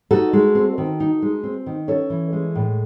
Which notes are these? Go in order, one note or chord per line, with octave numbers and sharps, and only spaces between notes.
D#4 F#4 A4
G#3
C4
D#3
D#4
G#3
C4
D#3
C#4 A4 C#5
E3
G#3
A2